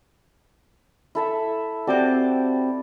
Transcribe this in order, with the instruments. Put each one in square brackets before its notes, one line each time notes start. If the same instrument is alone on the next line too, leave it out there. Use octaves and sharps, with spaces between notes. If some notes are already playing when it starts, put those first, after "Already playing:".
[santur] E4 A4 E5
[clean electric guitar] C4 F#4 G4 [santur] D5 A5 D6